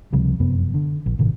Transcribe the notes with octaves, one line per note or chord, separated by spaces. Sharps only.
C#2 C3 F3 G3
F1 F#2 C3 B3
D3
A#1
G1 A2 C3 D#3